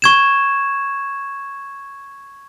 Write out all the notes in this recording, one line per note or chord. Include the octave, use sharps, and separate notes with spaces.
C#6 G#6 E7